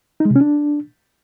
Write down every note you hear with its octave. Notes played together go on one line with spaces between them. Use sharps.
D#4
G#3
C3
C#4
D4